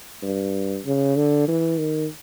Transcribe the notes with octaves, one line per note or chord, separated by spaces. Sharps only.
G2
C#3
D3
E3
D#3